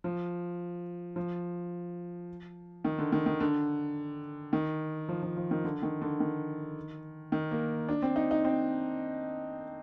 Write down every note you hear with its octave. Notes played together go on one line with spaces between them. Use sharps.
F3
F3
D#3
D3
D#3
D#3
D3
D#3
F3
F3
F3
D#3
D3
D#3
D3
D#3
D#3
A#3
D4
C4
D#4
D#4
C4